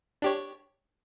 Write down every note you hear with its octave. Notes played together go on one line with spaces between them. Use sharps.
D4 G4 C#5